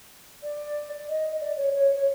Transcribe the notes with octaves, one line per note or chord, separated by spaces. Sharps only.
D5
D#5
D5
C#5
C#5
C#5